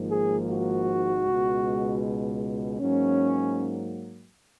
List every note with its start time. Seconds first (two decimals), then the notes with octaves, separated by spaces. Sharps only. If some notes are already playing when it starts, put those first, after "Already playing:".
Already playing: G#1 G#2 F3 A#3
0.11 G#4
0.49 F#4
1.26 C#2 B2 G#3
2.79 G#2 F#3 A#3 C#4